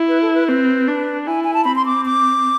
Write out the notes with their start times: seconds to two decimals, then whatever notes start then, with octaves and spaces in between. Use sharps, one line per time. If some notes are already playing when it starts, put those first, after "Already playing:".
Already playing: E4
0.09 B4
0.22 A4
0.35 B4
0.48 C4 B4
0.88 D4
1.26 E4 G#5
1.44 G#5
1.54 A5
1.64 C4 B5
1.76 C6
1.86 D6
2.05 D6